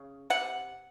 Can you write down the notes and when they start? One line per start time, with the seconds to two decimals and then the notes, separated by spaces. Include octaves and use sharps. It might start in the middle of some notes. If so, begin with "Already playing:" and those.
Already playing: C#3
0.30 C3 F#5